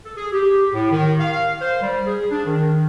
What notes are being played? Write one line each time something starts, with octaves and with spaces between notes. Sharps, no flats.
A4
G#4
G4
A2
D#3
F5
C5
G3
G#4
D4
D#3